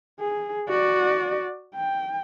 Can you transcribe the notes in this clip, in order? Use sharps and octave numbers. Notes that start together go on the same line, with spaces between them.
G#4
F#4 D5
G5